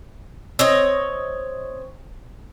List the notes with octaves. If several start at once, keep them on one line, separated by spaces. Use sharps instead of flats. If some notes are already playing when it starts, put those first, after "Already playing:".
C4 C#5 D#5